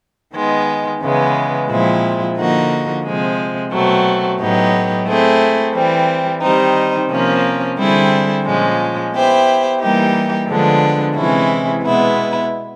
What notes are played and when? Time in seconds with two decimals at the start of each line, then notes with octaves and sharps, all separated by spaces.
0.34 D#3 G#3 B3
1.02 C#3 E3 G#3 B3
1.69 A#2 F3 G#3 C4 E4
2.37 D3 F3 A#3 D#4 F#4
3.05 C3 F3 G#3
3.72 B2 F#3 A3 C4
4.39 A2 F#3 B3 D#4 G4
5.07 A3 C4 E4 G#4
5.74 E3 G3 C4
6.42 D#3 G3 C4 D#4
7.09 C3 F3 A#3 C#4
7.77 D3 G3 C4 E4 G#4
8.45 A#2 F3 G#3 C#4
9.12 B3 E4 G4 C5
9.80 E3 G3 A#3 D#4 G4
10.48 D3 F3 G#3 B3 D4
11.15 C3 E3 G#3 C#4 E4
11.83 B2 G#3 B3 E4